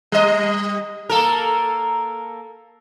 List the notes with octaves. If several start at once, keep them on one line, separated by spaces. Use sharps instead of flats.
G3 D#5
A#3 A4 A#4